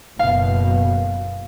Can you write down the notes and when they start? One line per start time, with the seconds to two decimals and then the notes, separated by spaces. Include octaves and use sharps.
0.19 F#1 F#2 B2 F5